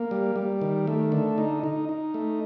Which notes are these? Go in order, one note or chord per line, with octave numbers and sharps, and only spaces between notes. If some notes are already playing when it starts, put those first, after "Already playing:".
Already playing: A#3
G3
G3
D#3
A3
D3
D#4
D#4
D#4
A3